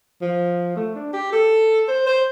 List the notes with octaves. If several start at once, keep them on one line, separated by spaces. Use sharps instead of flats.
F3
A3
D4
G4
A4
C5
C5